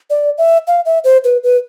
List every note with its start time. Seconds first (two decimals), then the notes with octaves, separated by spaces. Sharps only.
0.10 D5
0.38 E5
0.67 F5
0.86 E5
1.04 C5
1.24 B4
1.43 B4